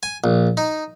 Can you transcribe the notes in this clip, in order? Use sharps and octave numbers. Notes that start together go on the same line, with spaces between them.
G#5
A#1
D#4